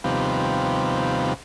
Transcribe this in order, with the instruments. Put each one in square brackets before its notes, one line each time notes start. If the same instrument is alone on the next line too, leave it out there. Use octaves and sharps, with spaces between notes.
[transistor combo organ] D#2 C3 F3 G3 B3